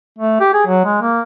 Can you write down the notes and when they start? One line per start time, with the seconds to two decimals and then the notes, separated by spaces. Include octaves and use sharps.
0.19 A3
0.40 G4
0.54 G#4
0.67 F#3
0.85 G#3
1.02 A#3